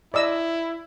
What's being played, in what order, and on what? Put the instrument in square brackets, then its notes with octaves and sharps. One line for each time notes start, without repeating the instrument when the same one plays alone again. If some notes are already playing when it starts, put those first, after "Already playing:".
[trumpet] E4 [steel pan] D5 D#5 E6